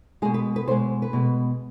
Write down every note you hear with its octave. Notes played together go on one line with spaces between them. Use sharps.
B2 G#3 G#4
B4
B4
B2 G#3 C5
B4
B2 G#3